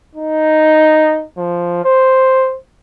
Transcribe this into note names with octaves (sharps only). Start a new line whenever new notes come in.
D#4
F3
C5